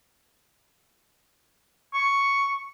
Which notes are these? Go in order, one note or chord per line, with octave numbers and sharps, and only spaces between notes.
C#6